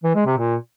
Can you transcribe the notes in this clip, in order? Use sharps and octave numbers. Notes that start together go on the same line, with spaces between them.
E3
G#3
C3
A#2